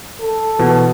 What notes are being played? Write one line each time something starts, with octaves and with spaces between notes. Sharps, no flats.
A4
B2 E3